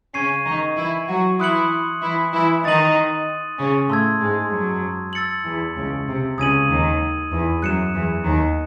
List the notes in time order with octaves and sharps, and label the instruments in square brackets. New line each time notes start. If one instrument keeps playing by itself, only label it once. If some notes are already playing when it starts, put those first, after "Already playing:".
[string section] C#3 C#4 [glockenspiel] C#6 G#6 C7 D#7
[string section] D#3 D#4
E3 E4
F#3 F#4
[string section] E3 E4 [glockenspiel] C6 D#6 F#6 C#7 F#7
[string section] E3 E4
E3 E4
[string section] D#3 D#4 [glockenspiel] D#6 A6 D#7 F#7
[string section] C#3 C#4
[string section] A2 A3 [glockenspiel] A5 C6 E6 G#6
[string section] G#2 G#3
F#2 F#3
[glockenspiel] E6 A6 C#7 F#7
[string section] E2 E3
C#2 C#3
C3
[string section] C#2 C#3 [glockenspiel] D#6 G#6 D#7 F#7
[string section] D#2 D#3
E2 E3
[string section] F#2 F#3 [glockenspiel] F#6 C#7 E7
[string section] E2 E3
D#2 D#3